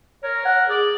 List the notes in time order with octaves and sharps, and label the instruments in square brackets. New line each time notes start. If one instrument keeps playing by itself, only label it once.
[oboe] A#4 [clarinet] C#5
[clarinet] F#5
[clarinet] G#4 [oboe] D5